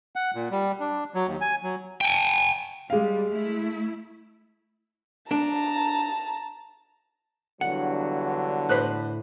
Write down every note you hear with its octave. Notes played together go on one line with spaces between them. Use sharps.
F#5
A#2
G3
D4
F#3
D#2
G#5
F#3
G5 G#5
G3 G#3 F5
A3 E4
D4 A5 A#5
E2 G2 D3 F#3 F#5
A2 B4 C5 B5 F#6